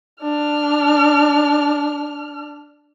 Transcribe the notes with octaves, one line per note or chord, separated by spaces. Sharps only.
D4 F6